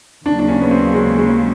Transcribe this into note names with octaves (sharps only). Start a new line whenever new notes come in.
D#2 C#3 F#3 D4
D4
C#4
B3
C4
G#3
G#3